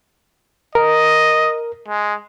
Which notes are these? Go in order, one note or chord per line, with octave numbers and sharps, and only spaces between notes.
A#4 D#5
G#3